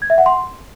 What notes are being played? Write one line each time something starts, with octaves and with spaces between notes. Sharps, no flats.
G#6
E5
F#5
C6